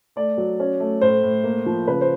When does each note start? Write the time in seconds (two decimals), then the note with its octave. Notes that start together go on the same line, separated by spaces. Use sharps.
0.16 A3 D5
0.37 F#3
0.60 C#4
0.80 A3
1.01 A2 C5
1.23 A2
1.44 A#3
1.66 F3
1.88 C#3 B4
2.01 C5